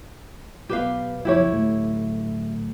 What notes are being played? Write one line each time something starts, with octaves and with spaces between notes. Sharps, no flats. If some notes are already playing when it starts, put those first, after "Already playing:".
B1 B3 G4 B4 F5
F#1 B1 F3 E4 G4 C#5
D1 A3